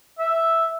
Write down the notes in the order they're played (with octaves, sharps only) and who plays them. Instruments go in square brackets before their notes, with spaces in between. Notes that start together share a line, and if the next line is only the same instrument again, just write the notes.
[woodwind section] E5